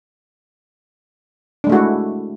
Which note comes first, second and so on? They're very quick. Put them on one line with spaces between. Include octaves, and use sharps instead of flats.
D4 G#3 A3 F#4 E4